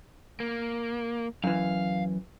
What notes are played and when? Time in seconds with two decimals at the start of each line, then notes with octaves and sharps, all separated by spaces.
0.40 A#3
1.44 F#2 E3 F5